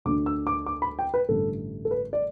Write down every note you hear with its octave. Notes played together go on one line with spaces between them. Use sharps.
D2 D3 A3 D4 D6
E6
D6
D6
B5
G5
B4
A1 G2 D3 A3 A4
A4
B4
D5